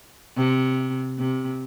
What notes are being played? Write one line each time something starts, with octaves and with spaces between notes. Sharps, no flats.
C3
C3